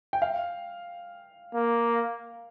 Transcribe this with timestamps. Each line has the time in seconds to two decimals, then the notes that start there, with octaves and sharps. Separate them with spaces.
0.13 G5
0.22 F5
1.55 A#3